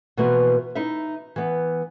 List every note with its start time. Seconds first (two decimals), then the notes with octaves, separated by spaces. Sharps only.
0.17 B2 E3 F3 A#3 B3
0.75 D#4 E4 E5
1.36 E3 B3